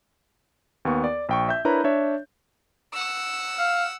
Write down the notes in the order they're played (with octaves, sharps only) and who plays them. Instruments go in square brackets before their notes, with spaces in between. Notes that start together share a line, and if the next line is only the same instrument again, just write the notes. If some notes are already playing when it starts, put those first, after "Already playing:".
[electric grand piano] D#2 B3 C#6
D5
A#1 G5 C#6
E5 G6
D4 E4 A#4 B4 C#5 A#5
D4 C#5 E5
[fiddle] F#5 E6
[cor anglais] F5